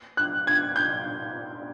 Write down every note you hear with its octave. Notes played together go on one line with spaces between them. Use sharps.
F#6
G#6
G6